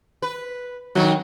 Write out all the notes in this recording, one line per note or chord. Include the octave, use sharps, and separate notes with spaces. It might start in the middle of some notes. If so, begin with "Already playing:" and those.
B4
D#3 F#3 D#4